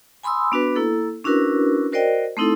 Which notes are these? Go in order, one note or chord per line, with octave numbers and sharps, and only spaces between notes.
G#5 B5 C6 D#6 E6
B3 D4 F#4 B4
A#3 E4 A4
C#4 D4 E4 F#4 A#4 B4
F#4 A#4 C5 D5 D#5 G5
A3 C4 D#4 E4 A4